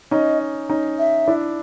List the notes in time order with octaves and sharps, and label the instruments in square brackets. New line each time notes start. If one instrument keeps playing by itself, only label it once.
[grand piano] C#4 D#4 [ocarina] D#5
[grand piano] C#4 D#4
[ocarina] E5
[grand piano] D4 E4